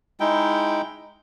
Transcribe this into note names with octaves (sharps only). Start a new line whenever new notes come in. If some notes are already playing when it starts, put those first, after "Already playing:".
G#3 D#4 E4 G5